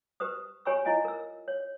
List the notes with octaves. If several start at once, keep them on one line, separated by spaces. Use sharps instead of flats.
G4 B4 C5 D#6
G4 C#5 G#5 B5 C#6 E6
E4 F4 D#5 F5 G#5
A#4 E6
C#5